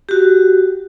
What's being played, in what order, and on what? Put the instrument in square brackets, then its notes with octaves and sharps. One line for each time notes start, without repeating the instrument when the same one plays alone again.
[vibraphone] F#4 G4